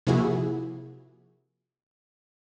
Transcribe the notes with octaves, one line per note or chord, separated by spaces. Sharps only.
C3 F3 A#3 E4 F#4 G#4